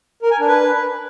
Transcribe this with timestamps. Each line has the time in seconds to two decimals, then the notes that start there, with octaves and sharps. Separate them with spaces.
0.22 A#4
0.31 G#5
0.39 D4
0.48 B4